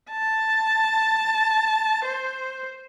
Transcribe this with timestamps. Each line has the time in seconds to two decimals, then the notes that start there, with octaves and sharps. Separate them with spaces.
0.10 A5
2.06 C5